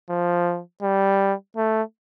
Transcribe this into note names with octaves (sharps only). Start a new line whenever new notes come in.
F3
G3
A3